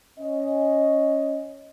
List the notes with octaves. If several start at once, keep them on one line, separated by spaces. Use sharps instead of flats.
C#4 D#5